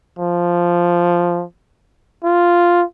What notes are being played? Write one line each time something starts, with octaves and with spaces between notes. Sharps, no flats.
F3
F4